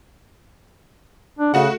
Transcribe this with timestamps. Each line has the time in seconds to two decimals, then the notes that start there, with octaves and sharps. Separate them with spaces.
1.39 D4
1.54 C#3 A3 F#4 F#5